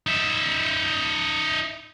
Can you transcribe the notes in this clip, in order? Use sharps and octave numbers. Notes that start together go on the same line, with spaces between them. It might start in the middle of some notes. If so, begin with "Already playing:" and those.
D#4 E5